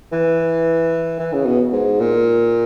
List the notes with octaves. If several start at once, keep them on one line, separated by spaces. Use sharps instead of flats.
E3
E3
C#3
B2
G#2
A#2